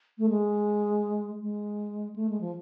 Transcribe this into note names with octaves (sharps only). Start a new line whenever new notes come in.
A3
G#3
G#3
A3
G#3
F3